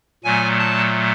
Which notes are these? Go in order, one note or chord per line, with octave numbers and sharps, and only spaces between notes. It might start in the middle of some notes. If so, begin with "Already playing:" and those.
A#2 F#3 A3 G#5
A5